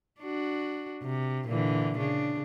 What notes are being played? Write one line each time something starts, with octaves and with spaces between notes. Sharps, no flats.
D4 F#4
C3
A#2 D3 E3
C#3 D4